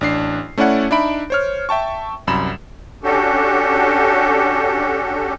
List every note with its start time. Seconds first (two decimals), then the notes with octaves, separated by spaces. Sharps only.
0.01 A1 D4 C7
0.58 A3 C#4 E4 D5 F#5
0.91 D4 D#4 E5 B5 D7
1.30 C5 C#5 F6
1.69 E5 G5 A5 C#6
2.27 C2 F#2 B5 E7
3.03 C#4 D4 F#4 G4 A4